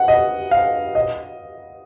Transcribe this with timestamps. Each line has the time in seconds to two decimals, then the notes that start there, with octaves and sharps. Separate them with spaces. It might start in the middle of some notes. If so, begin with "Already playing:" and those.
Already playing: F#5
0.08 D#5
0.51 F5
0.95 D#5